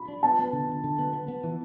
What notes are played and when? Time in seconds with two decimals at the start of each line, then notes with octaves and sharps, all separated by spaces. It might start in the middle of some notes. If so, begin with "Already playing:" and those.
Already playing: B5
0.08 D4
0.23 B3 A5
0.39 B3
0.53 D3
0.69 D3
0.84 D3
0.99 B3
1.13 B3
1.28 B3
1.44 E3